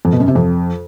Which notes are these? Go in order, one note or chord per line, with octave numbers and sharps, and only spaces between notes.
F2
B2
F#2
C3
F2